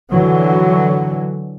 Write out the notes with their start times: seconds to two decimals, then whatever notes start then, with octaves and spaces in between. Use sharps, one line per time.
0.11 D3 E3 F#3